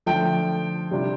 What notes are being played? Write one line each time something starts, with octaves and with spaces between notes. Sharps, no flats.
D3 F3 A3 G5
C3 G3 D4 F4